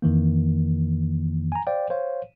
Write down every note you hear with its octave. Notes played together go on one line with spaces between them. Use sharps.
F2 D#3 E3 A#3
G#5 A#5
C5 D5 F5 G5
C5 C#5 F5